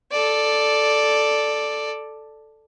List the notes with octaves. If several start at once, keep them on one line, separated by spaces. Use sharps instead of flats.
A4 D5